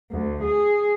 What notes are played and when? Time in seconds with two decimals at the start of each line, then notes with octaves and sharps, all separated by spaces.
0.12 D2
0.43 G#4